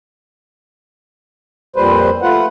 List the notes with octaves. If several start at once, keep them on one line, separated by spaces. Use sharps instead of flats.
F2 A#2 G3 B4 C5
A3 F4 B4 F#5